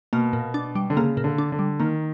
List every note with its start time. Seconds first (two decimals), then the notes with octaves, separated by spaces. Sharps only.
0.13 B2 A#3
0.33 A#2
0.54 D4
0.75 G3
0.90 D3
0.97 C#3 A#3
1.17 A#2
1.24 D3
1.38 D4
1.52 D3
1.59 G3
1.80 D#3 A#3